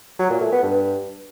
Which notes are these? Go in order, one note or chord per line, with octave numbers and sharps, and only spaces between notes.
F#3
A#2
A3
B3
G2